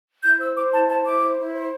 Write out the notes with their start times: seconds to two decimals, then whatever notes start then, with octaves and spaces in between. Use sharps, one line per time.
0.23 E4 G6
0.39 C5 E6
0.55 C5 D6
0.72 E4 A5
0.89 C5 A5
1.05 E4 D6
1.22 C5
1.38 E4
1.54 C5